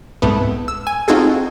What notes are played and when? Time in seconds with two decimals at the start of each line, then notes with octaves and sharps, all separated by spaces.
0.22 C2 G#2 A3 B3
0.68 E6
0.87 G#5
1.08 C4 D#4 F4 F#4 G#4 A4